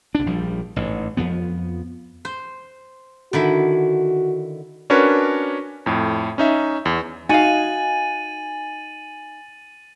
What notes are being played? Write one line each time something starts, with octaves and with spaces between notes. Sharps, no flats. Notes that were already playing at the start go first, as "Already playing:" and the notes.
C2 D4
A#1 F3 G3
A1 G#2
F2 F3 B3
C5
D3 D#3 E4 F#4
C#4 D4 F#4 A#4 B4 C#5
F2 A2
C#4 D#4 E5
E2
D#4 F#4 F5 G#5 A6 D#7 F#7